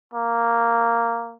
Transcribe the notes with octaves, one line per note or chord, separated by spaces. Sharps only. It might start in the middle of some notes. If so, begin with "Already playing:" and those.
A#3